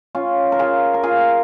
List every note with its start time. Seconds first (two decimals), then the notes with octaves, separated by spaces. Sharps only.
0.15 C#4 F4
0.52 A#4
0.59 F4 G#4
0.94 A#4
1.03 F4 G#4